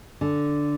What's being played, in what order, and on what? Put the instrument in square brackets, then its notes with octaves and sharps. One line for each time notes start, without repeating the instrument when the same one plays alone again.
[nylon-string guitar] D3